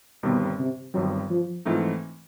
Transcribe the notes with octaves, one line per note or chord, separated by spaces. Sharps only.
G1 G2 B2 D#3 G3 C4
C3
G1 G2 D#3 F#3 G3 C4
F3
G#2 E3 F3 A3 C4 D#4